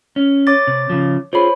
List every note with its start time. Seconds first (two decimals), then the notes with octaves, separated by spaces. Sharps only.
0.16 C#4
0.47 C#5 D6 A6
0.67 C3
0.90 C#3 F3
1.33 F4 G#4 C5 C#5 B5